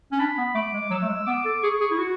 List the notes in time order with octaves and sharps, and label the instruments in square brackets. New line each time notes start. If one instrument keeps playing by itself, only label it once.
[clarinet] C#4
[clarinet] D4 [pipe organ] B5
[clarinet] B3
[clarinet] A3 [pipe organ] D6
[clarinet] G#3
[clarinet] F#3 [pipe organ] E6
[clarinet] A3
G#3
[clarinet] B3 [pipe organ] D6
[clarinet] A4
[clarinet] G#4 [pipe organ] C#6
[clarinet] G#4
E4
F#4